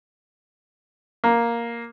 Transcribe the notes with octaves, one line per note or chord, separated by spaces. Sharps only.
A#3